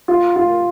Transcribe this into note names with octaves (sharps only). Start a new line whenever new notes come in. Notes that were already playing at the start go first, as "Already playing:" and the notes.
F4
F4